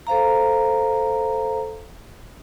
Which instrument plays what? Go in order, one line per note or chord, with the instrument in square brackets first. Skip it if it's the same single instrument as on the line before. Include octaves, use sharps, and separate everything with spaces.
[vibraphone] A4 C5 F5 A#5